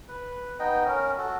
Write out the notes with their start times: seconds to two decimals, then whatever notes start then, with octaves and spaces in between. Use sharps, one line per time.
0.08 B4
0.59 B3 D#4 D#5 G5
0.86 C#4 A#4
1.18 F#4 A4